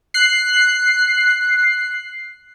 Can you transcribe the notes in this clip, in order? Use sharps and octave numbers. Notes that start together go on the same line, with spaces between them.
F#6 C7